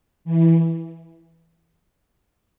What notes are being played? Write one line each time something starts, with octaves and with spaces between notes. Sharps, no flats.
E3